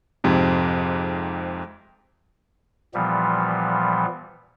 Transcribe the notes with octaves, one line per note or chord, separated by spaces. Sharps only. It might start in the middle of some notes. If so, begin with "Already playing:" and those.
F2 G#2 C3
A#2 E3 F3 G3 B3